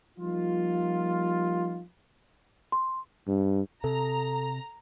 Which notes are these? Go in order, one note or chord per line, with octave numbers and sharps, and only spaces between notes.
F3 G3 A#3 D#4 F4
C6
G2
C3 A4 A#5